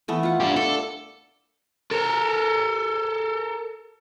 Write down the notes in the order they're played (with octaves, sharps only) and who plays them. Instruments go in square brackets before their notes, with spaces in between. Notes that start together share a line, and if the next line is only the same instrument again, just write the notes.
[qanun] E3 A3 B3
F4 F#5
[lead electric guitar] D4 G4
[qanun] D4 D5 [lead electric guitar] A4
[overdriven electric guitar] A4 A#4